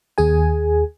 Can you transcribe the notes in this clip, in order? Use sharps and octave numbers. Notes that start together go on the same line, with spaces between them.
D#2 G#4 G#5